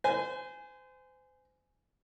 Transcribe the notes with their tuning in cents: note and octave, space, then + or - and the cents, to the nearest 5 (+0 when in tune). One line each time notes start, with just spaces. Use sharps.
C5 -35 G#5 +0